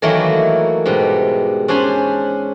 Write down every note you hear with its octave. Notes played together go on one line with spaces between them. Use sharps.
D#3 E3 F#3 A3 A#3 E4
G#2 B2 G3
C#4 D4 C5 G#5 B5